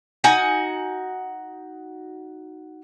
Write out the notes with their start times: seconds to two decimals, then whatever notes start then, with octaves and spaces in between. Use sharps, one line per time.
0.24 D#4 F#4 F#5 G#5